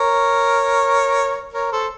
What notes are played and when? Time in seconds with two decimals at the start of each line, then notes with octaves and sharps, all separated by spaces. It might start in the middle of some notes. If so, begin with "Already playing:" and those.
Already playing: A#4 C#5
1.53 A#4 C#5
1.72 A4 C5